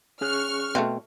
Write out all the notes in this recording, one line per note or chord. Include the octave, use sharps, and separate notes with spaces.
C#4 G#4 C#6 F6 F#6
B2 A3 C4 F5